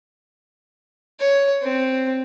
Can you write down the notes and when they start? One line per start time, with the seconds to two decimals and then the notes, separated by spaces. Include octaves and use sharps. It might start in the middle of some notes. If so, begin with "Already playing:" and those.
1.20 C#5
1.63 C4